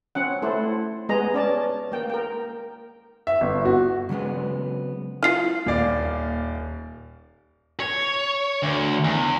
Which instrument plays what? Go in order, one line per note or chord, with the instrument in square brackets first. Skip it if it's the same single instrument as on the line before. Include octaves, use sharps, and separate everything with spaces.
[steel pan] C4 C#4 F#5
A3 E4 A4 C5
G#3 B3 G#4 D#5 A#5
C#4 D5 A5
A#3 G5
A#4 G5
[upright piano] E5
G1
F#4
[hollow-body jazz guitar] C#3 F#3 G#3 B3 C4
[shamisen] E4 F4 [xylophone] F6 C7
[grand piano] D#1 D5 F5 [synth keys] A#3
[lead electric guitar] C#5
D2
E2